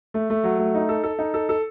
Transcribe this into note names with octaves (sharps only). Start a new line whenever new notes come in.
A3
A3
F#3
A3
D#4
A4
A4
D#4
A4
A4